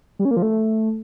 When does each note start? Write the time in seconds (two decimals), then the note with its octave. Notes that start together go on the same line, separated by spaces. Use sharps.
0.19 G3
0.25 C#4
0.31 A#3
0.37 F3
0.42 A3